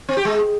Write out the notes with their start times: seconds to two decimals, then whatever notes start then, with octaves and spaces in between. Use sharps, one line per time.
0.09 C4
0.17 G4
0.25 G#3